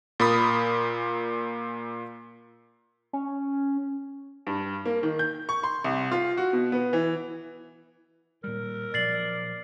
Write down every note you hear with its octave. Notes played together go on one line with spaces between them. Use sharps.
A#2 A#4 B5 D#6
C#4
G2
A#3
D#3
G6
C#6
C6
C2
F4
F#4
B2
B3
E3
A#2 G3 A#4
A#2 F3 F#3 D5 A6 C7 F#7